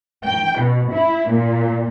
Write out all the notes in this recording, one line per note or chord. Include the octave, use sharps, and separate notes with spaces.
G5
B2
E4
A#2